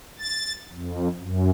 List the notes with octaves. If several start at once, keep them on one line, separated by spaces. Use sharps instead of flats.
A6
F2
F#2